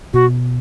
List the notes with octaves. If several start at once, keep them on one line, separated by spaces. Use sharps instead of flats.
B2 F#4